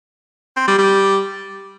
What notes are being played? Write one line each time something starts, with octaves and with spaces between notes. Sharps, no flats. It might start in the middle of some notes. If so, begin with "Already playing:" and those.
C4
G3
G3